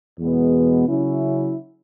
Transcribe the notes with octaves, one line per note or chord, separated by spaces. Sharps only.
E2 B2 G#3 B3
C#3 F#3 C#4 E4